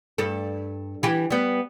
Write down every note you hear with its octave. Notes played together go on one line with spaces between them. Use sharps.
G2 A4
E3 G4
G3 B3